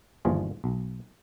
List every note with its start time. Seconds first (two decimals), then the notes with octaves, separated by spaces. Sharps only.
0.25 G1 D#2 E3 F3 F4 G#4
0.64 B1